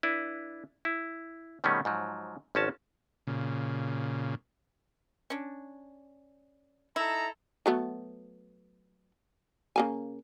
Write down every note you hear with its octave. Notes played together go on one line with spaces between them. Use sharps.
D4 E4 B4
E4
B2 D#3 G3 A3 B3 C#4
G#2 F3 F#3
G#1 F3 C#4 F#4 A5
A#2 C#3
C#4 D4
D#4 E4 A4 A#5
F#3 A3 B3
C#3 A#3 G#5